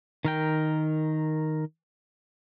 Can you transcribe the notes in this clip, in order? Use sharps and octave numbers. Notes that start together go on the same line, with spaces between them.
D#3 A#4 G5